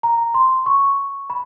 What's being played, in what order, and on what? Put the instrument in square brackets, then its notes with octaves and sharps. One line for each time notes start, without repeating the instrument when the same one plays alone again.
[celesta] A#5
C6
C#6
B5